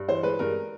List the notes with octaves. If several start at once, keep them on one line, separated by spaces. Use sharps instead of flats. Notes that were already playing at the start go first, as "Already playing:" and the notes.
Already playing: G2
E3 C5
G#3 B4
G2 A#4